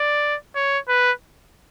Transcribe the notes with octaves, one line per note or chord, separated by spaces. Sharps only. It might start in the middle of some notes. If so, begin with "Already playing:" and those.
Already playing: D5
C#5
B4